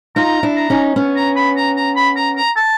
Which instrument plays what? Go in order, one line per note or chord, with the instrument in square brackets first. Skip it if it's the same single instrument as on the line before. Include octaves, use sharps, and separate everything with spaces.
[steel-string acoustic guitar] D#4 F4 [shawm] A#5
[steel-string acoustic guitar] D4 E4
[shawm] A#5
[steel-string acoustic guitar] C#4 D#4
B3 C#4
[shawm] A#5
B5
A#5
A#5
B5
A#5
A#5
A5